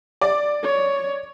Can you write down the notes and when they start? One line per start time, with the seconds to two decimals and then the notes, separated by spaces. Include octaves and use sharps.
0.21 D5
0.63 C#5